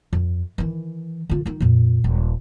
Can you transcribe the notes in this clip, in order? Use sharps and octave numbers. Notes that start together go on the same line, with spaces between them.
F2
D#3 E3
D3 F4
D#3 D#4
F2 A#2
D#1